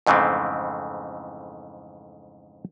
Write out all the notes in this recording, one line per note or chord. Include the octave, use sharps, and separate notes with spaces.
F2 G#2 C#3 E3 A3 C4